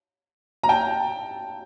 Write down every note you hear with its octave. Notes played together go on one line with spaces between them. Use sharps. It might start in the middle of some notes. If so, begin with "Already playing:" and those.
A#5
G5 A5